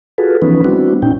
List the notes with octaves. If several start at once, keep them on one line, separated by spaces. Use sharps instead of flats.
F4 F#4 G#4 A4 B4
E3 F3 B3 C#4 D#4 B4
G3 B3 C4 D4 E4 F#4
A#2 C#4 D#4 G5